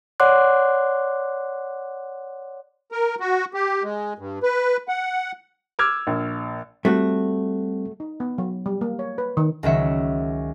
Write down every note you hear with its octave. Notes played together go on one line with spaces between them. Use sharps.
C#5 D5 F#5 C6 D6 F#6
A#4
F#4
G4
G#3
G2
B4
F#5
D6 E6 F6 G#6
A#1
G3 A3 C4 F#4
D#4
B3
F#3
G3
A#3
C#5
B4
D#3
C#2 D#3 F#3 E5 C#7